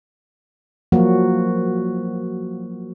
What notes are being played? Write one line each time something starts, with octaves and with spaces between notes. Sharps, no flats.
F3 F#3 A#3 F4 F#4